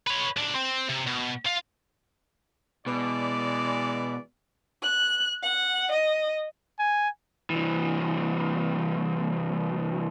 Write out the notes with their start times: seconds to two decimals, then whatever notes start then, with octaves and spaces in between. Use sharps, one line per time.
0.07 B4 C#5
0.37 C#2 D4
0.55 C4
0.89 C3
1.07 B2
1.46 F4
2.86 B2 E3 G#3 D5
4.82 F#6
5.42 F#5
5.92 D#5
6.79 G#5
7.50 C2 E3